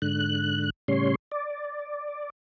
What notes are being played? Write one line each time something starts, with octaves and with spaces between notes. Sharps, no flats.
G#2 D3 F#6
A2 C#3 G3 C#4 C#5 C6
D5